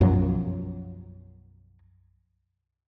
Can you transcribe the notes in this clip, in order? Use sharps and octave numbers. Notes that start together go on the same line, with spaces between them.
B1 F#2 F3 F#3